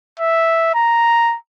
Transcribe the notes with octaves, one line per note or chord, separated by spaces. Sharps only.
E5
A#5